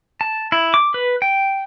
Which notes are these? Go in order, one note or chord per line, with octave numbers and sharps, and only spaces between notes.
A5
E4
D6
B4
G5